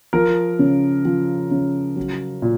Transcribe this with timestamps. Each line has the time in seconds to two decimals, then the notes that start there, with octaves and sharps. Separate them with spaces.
0.13 F3 A#4
0.59 C#3
1.05 F3
1.51 C#3
1.96 F#3
2.42 A#2